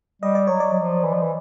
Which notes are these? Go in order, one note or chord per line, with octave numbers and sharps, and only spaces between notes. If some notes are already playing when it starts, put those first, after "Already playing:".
G3 D#5
D5
F#3 C#5
D5
F#3
F3
E3
F3
E3